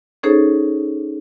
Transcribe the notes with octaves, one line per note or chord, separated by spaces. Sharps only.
C#4 D#4 G#4 A4 C5 C#5